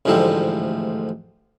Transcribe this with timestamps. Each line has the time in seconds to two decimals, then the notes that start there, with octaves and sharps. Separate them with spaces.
0.05 A1 D2 G#2 F3 G3 A4